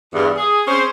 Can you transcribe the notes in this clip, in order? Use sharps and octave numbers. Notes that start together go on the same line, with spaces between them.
E2 G2
G#4
C4 C#4 G#4 C5